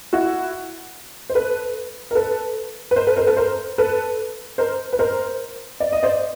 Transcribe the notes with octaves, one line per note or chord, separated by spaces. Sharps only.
E4 F#4
C5
A4 B4
A#4
A4 B4
B4
A#4 C5
A4 B4
A#4 C5
A4 B4
A#4 C5
A4 B4
A#4 C5
B4
A#4 C5
D5
D#5
C5 D5